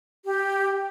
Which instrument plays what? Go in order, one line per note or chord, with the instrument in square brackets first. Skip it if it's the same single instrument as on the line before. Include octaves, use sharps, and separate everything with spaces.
[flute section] G4